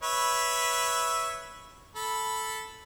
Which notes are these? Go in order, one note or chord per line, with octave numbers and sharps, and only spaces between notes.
B4 C#5 E5
A4 B5